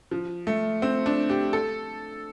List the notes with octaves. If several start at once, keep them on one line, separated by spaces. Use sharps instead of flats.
F3
A3
C4
D4
G4
A4